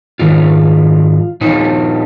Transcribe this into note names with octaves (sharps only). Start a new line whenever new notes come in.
G#2 D#3 F4
A#2 F3 D#4